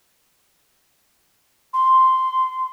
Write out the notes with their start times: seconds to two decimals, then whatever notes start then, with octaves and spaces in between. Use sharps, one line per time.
1.73 C6